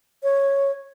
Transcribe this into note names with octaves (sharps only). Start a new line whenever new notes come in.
C#5